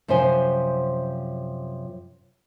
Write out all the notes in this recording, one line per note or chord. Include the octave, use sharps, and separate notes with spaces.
F#2 C3 F3 C5 G#5